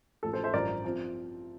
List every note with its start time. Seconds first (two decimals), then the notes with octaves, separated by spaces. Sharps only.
0.23 A1 A2 F3 A4
0.33 A4 C5
0.44 C5 E5
0.53 A1 G2 F3 A#4 D5
0.84 F3 C4